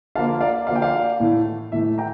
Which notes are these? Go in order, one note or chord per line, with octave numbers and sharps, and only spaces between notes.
D3 F3 A#3 F5 A5
D5 F5
D3 F3 A#3 F5
G5
D5 F5
A2 E3 A3
A2 E3 A3 E5
G5 A#5